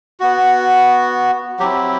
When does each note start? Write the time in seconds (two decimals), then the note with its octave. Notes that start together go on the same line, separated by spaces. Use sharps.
0.20 B3 F#4
1.59 F#3 C4 E4 G4